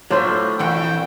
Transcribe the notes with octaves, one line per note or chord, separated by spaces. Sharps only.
A2 F#3 A3 D4 F4 C5
F2 A#2 E3 F#5 G5